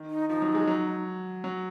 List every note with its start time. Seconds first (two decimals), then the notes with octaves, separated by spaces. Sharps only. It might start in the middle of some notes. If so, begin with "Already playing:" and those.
Already playing: D#3
0.10 D#4
0.29 F3 D#4
0.42 F#3
0.55 G#3
0.67 F#3
1.44 F#3